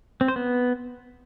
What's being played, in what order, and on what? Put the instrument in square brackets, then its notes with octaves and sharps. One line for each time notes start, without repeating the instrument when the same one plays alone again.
[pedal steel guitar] C4
C5
B3